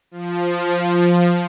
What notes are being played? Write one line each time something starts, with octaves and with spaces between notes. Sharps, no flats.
F3